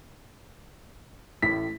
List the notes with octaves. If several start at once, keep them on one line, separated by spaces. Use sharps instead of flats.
A1 A2 B6